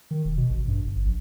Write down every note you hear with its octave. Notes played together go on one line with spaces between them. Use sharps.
D#3
E1
B2
A1
G2
G1
A#1